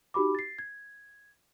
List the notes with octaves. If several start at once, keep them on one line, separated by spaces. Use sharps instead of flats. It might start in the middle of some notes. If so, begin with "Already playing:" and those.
D#4 F#4 G4 B5 D6
A6 C7
G#6